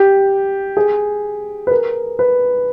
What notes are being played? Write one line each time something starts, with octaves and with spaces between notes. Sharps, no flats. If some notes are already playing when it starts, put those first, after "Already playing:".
Already playing: G4
G#4
B4
A#4
B4